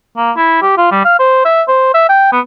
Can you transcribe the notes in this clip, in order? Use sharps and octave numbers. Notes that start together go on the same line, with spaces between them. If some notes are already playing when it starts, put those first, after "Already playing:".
A#3
E4
G4
F4
G3
F5
C5
E5
C5
E5
G5
B3